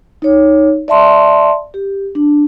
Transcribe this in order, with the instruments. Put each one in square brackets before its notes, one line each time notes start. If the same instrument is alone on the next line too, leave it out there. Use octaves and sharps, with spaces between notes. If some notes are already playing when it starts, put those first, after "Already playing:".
[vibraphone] D#4 C#5
D5 E5 A5 C6
G4
D4